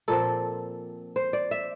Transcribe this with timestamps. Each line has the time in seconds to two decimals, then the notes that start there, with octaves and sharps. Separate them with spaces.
0.08 A#2 F3 C4 A4
1.16 C5
1.33 D5
1.51 E5